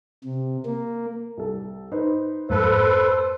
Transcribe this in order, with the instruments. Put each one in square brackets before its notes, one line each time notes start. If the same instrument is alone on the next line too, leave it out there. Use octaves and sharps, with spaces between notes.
[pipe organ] C3
A#3
[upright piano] C2 A4
D#4 B4 C5
[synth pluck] F2 G#2 [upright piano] A#3 [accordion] A4 B4 [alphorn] C5